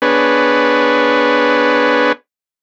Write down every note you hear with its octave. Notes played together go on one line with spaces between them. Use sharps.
B3 D4 G#4 B4 C#5